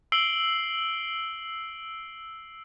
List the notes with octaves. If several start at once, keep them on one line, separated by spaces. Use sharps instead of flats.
E6 C7 D7 F#7 G7